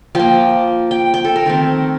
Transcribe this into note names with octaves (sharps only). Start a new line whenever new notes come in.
F3 A#3 G5
G5
G5
A4
A#4
D#3 A3 C4